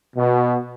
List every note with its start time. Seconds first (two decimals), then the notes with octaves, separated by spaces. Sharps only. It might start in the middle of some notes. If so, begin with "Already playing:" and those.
0.16 B2